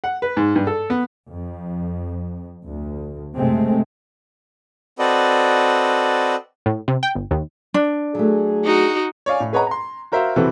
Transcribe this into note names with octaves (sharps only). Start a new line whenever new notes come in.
F#5
B4
G#2
G2
A4
B3
F2
D2
F#1 C3 G#3 A3 C4
C4 F#4 A4 B4 D5 D#5
A2
C3
G5
G1
D#2
D4
F#3 A3 G#4
D#4 F#4
C#5 D5 F5 G#5
A2
G#4 B4 C#5 D#5 F#5 A#5
A#5 C6
F#4 A#4 C5 E5 F5
C3 E3 C4 F#4 A4 B4